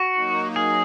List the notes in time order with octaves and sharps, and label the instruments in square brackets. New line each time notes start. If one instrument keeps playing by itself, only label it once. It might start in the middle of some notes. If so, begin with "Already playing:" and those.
Already playing: [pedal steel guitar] F#4
[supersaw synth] F#3 A#3 D#4
[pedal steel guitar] G#4